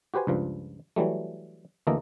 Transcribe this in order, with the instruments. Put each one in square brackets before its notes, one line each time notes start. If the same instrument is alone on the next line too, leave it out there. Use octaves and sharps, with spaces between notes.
[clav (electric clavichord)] F#4 G4 B4 C5 G#5
C#2 G2 F3
E3 F#3 G3 A3
D2 E3 A#3 A4 D#5 A#5